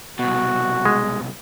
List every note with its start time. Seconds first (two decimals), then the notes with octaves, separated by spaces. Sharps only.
0.19 C2 B2 F#4
0.85 G#3